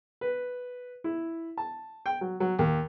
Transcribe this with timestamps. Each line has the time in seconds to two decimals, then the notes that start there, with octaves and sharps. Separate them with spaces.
0.21 B4
1.04 E4
1.57 A5
2.06 G5
2.21 F#3
2.40 F#3
2.59 D#2